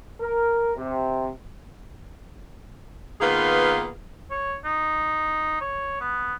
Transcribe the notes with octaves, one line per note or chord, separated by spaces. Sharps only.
A#4
C3
D#3 A#3 B3 F4 G#4 B4
C#5
D#4
C#5
B3